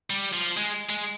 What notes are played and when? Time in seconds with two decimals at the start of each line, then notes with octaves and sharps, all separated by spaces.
0.10 G3
0.33 F3
0.57 G#3
0.89 G#3